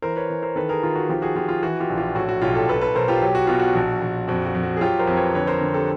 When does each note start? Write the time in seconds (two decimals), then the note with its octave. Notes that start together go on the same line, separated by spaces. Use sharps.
0.02 E3 A#4 C5
0.16 B4 C#5
0.30 E3
0.42 A#4 C5
0.56 D#3 A4 B4
0.69 G#4 A#4
0.83 D#3 F4
0.95 F#4
1.09 F3 F4 G4
1.22 F#4 G#4
1.35 F3 F4 G4
1.49 F4
1.63 E3 F#4
1.80 F4 G4
1.90 A#1
1.97 F4 G4
2.15 A2 F#4
2.29 F#4
2.42 B1 F4 G4
2.55 G4 A4
2.69 B1 A4 B4
2.81 A4 B4
2.95 B1 A#4 C5
3.08 F4 G4
3.21 F#3 G4
3.35 F#4
3.47 B2 F4
3.59 F#4
3.75 A#1
4.02 A#1
4.28 F2 F#4
4.46 F#4
4.55 F2
4.63 F#4
4.77 G#4
4.81 F#3 F4 G4
4.99 A#4 C5
5.07 F2
5.17 B4 C#5
5.34 D3 B4 C#5
5.47 A#4 C5
5.61 D3
5.74 G4 A4